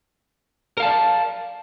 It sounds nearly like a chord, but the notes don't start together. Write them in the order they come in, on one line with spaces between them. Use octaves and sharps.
A#4 F5 A5 D5